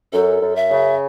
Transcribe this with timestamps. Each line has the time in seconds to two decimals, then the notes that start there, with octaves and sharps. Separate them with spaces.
0.13 F#2 A4
0.41 F#2
0.56 E5
0.71 C#3